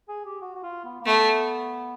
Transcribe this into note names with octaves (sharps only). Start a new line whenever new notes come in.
G#4
G4
F#4
F#4
F4
B3
A#3
A3 B3